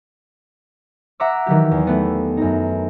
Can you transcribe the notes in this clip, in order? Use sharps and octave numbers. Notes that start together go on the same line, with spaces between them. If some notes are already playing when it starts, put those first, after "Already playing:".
E5 F#5 A#5 C#6 D6 E6
D#3 E3 F#3 G4
E2
A3 B3
F#2 D#4